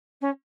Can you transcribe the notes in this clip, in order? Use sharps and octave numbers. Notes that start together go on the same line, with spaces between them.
C#4